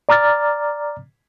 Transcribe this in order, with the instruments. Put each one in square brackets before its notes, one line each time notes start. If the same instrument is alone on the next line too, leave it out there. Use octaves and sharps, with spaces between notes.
[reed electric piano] D5 A#5 D6 F6 A6